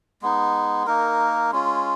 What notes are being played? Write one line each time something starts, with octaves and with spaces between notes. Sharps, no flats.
G#3 B3 D#4
A#3 D#4 A#4
G#3 C#4 F4